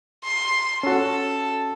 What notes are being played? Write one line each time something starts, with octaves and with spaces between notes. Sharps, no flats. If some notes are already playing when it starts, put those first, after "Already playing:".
C6
C#4 F#4 A4